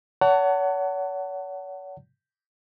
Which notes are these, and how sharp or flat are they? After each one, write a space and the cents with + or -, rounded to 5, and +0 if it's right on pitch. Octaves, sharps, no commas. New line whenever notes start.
C#5 +40 F#5 +15 A5 +30